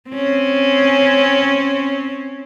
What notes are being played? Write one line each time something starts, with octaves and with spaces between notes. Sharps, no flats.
C4 C#4